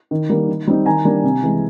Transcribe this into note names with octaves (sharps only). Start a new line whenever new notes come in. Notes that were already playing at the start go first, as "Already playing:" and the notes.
D#3
G3 A#3
D#3
G3 C4 D#4
D#3 G#5 A#5
G3 A#3 D4
C3
E3 G#3